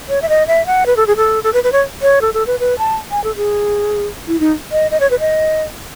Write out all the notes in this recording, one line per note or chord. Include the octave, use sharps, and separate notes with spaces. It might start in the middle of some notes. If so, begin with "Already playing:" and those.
C#5
E5
D#5
E5
F#5
B4
A4
G#4
A4
A4
B4
B4
C#5
C#5
A4
A4
B4
B4
A5
G#5
A4
G#4
E4
D#4
D#5
D#5
C#5
B4
D#5